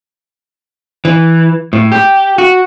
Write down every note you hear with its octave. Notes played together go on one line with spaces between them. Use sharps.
E3
A2
G4
F#4